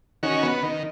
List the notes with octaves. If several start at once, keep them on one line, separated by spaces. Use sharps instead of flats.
D#3 C#4 F#4
B3
D#3